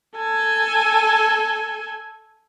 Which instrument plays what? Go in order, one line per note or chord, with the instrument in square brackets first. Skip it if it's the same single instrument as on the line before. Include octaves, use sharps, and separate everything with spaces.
[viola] A4 G#5